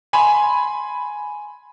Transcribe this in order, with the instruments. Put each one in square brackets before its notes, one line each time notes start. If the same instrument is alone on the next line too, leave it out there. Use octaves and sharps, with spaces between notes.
[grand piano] G#5 B5 C6